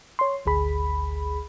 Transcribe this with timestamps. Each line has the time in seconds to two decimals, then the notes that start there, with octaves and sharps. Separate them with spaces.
0.19 C#5 C6
0.46 G#1 D2 G#4 B5